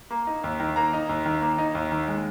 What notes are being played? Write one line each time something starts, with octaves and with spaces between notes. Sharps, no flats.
A#3
D#4
D#2
D#3
A#3 A#5
D#4
D#2
D#3
A#3
D#4
D#2
D#3
G#3